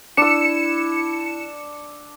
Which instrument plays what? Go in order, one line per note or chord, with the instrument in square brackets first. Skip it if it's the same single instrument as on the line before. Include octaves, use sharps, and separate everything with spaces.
[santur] D4 E6 [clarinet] E4 [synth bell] C#7 E7